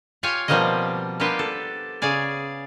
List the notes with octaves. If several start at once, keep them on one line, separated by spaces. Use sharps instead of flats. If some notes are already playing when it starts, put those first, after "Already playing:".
F4 G4 C#5 F5 G#5
B2 F3 G3 A#3 C4 D#5
A#3 B3 D4 G4 B4 C5
A4
C#3 G#4 D5 G#5